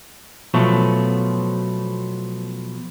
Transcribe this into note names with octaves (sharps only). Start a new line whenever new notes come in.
B2 F3 F#3 A3